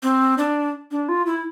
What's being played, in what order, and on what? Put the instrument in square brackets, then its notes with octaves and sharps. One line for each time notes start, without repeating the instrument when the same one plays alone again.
[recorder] C4
D4
D4
F4
E4